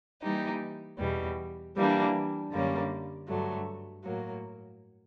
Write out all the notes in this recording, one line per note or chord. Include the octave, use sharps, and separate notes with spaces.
E3 G3 A#3 D#4 G4
E2 B2 G3
E3 G3 A#3 D4
F#2 D3 G3 A#3 C#4
G2 D3 F#3 A3
A2 F#3 A#3